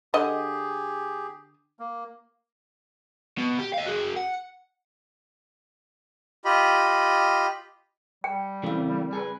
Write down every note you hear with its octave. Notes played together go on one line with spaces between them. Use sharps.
D3 G4 G#4 D#5
A#3
B2
G4
D#5 F5
F#4 G#4
F#5
F4 G4 D#5 B5
G3 G5
C#3 E3 A3 A#3 C4
G#4 A4 B4